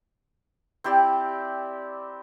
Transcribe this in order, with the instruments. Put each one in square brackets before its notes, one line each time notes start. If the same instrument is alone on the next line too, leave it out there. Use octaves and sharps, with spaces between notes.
[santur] C4 E4 G4 D5